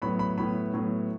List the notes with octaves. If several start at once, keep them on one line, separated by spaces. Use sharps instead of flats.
A2 F#3 B3 B5
B5
A2 F#3 B3 B5
A2 F#3 B3